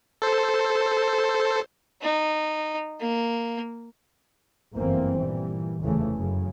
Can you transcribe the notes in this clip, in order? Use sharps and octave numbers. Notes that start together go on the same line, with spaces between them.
A4 C5
D#4
A#3
G1 F#2 E3 A#3 C4
A#2 E3 G3
F1 D#2 C#3 E3 A3
F#2 C#3